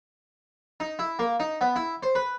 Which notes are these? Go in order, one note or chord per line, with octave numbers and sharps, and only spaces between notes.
D#4
E4
A#3
D#4
B3
E4
C5
B4